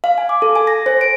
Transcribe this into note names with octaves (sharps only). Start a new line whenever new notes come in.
F5
G#5
D6
A4
G#5
A#6
C5
D7